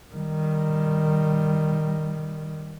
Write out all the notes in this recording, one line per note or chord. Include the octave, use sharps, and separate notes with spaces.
D#3 G3